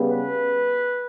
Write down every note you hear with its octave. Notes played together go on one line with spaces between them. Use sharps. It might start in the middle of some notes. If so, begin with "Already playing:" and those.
Already playing: C#3 G3 B3
B4